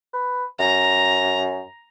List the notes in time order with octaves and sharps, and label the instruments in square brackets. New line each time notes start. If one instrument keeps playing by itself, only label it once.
[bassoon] B4
[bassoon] F#2 [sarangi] A#5